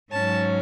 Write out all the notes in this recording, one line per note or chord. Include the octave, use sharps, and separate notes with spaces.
G#2 F#3 C#4 A5